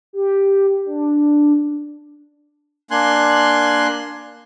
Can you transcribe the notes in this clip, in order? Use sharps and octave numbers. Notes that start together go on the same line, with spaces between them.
G4
D4
A#3 D4 G#5 C6 F#6